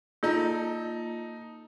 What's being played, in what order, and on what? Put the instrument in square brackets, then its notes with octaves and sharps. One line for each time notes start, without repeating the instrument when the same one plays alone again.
[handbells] A#3 F4 A#5 [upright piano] D#4 A4